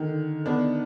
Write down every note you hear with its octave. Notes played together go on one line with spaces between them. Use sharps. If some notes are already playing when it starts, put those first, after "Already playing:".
Already playing: D3 D#3
B3 D4